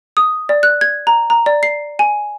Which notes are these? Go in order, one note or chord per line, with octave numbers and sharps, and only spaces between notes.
D#6
D5
F#6
G#6
A#5
A#5
D5
C7
G#5